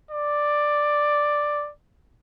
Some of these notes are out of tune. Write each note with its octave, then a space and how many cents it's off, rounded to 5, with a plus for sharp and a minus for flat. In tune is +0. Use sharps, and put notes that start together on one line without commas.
D5 +5